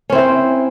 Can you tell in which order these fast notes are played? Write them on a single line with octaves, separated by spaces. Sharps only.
C#4 C4 E4 C5